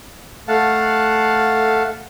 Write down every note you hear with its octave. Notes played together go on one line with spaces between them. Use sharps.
A3 F5 F#5 A5